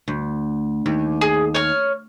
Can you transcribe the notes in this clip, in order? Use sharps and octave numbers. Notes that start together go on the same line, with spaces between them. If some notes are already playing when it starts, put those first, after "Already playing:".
D2
D#2
G#4
C#5 F6